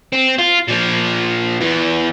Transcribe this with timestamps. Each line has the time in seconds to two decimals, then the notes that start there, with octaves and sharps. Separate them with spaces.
0.12 C4
0.38 F4
0.68 A#2 F3
1.61 E2 E3